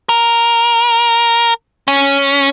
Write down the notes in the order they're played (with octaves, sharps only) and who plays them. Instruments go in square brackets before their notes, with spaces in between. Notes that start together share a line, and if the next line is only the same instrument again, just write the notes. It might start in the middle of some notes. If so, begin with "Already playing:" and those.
[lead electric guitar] A#4
C#4